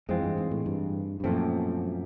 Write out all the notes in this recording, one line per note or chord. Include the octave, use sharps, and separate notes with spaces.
F2 E3 G#3 C4 F4
G2
G#2
A2
G2
G2
F#2 A#2 F3 A3 C4